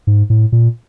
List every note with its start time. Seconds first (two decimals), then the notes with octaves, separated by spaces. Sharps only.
0.07 G#2
0.30 A2
0.52 A#2